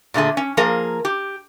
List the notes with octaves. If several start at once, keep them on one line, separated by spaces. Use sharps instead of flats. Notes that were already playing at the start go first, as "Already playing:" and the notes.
A#2 D3 A3 G#4
C#4
F3 A#3 G#4 A#4
G4